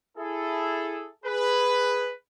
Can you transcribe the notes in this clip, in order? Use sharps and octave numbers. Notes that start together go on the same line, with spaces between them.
E4 G#4 A4
G#4 B4